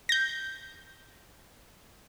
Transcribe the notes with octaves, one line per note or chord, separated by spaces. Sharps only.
G6 A#6